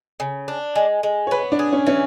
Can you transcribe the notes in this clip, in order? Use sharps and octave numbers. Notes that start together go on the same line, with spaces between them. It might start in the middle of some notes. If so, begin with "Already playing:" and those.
C#3
D4
G#3
G#3
C#5
B3 B4
D4
G#4
C#4
E3 C#4